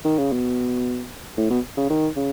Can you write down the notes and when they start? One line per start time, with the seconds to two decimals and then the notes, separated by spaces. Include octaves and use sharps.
0.04 D#3
0.18 C#3
0.33 B2
1.37 A2
1.50 B2
1.77 C#3
1.90 D#3
2.16 C#3